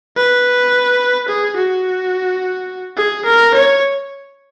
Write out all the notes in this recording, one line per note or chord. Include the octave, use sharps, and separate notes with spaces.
B4
G#4
F#4
G#4
A#4
C#5